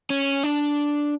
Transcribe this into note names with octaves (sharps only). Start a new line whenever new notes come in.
C#4
D4